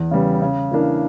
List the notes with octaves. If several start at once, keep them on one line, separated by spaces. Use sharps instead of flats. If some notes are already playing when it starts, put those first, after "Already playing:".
Already playing: E2
C#3 G3 B3
C#3
E3 A#3 D4